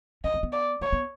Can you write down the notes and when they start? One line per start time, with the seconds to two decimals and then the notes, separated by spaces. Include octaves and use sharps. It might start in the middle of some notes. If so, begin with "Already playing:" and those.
0.24 C#4 D#5
0.34 C4
0.43 B3
0.52 D5
0.81 A#3 C#5
0.93 B3